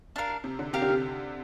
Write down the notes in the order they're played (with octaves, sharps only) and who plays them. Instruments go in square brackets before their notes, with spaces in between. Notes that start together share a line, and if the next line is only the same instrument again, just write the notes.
[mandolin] D4 A#4 F5
[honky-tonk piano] C3
D3
[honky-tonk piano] C3 [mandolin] G4 A#4 F5
[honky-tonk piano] D3
C3